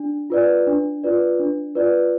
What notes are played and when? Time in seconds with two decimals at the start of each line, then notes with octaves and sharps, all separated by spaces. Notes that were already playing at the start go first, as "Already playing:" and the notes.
Already playing: D4
0.30 F4 B4 D5
0.67 D4
1.03 F4 B4 D5
1.40 D4
1.75 F4 B4 D5